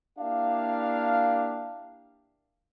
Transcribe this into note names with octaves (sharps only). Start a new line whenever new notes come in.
A#3 D4 E4 G4 E5 F5